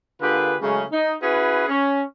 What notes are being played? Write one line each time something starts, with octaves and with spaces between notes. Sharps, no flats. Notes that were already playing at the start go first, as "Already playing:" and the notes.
D3 A#3 F4 G4 G#4 B4
C#3 F#3 G#3 A3 C#4
D#4
C#4 E4 F#4 G#4 B4
C#4